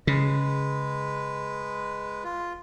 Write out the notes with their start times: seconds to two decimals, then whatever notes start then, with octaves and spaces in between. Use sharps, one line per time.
0.07 C#3 G#3 B4
2.24 F4